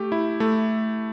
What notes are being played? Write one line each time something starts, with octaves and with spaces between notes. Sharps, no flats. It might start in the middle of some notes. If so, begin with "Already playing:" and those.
Already playing: A3 G4
E4
A3